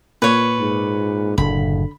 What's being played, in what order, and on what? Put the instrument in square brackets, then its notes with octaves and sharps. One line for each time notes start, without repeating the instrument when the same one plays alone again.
[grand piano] A#2 [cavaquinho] B4 C#5
[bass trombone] G#2
[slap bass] F#1 A2 [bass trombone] D3 [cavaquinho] B5